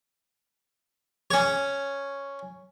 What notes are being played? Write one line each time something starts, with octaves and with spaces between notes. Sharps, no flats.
C#4 C#5